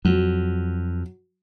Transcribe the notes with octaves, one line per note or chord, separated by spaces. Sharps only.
F2 F#3